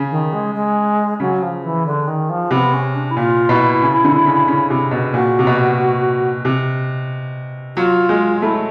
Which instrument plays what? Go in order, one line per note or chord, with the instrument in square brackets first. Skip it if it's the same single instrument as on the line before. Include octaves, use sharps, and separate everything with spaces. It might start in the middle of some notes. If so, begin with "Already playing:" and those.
Already playing: [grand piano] C#3
[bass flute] D#3
G#3
G#3
[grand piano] C#3 [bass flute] F#3
[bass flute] F3
E3
D3
D#3
F3
[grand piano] C3 [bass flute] B3
[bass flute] C#4
D4
E4
[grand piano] A#2 [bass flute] F4
[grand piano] B2 [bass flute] E4
[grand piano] C#3
D3
C#3
C#3
C3
B2
[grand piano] A#2 [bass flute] F#4
[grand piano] C3
B2
C3
[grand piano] F#3 [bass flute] F4
[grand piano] G#3
[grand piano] A3 [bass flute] E4